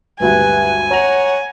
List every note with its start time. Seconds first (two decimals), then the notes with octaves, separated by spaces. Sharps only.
0.20 G#1 D2 G2 B4 G#5
0.91 C#5 F#5 A#5 A#6 F7